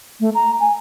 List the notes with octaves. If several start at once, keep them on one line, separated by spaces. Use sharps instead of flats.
A3
A#5
G#5